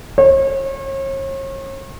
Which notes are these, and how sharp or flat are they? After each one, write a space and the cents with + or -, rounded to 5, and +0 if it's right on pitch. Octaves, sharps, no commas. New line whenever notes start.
C#5 -40